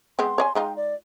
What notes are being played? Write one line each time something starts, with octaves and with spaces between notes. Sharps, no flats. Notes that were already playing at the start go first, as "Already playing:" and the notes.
G#3 B3 C4 C6
C#5 D5 G#5
G#3 D#4 F4 G5
D5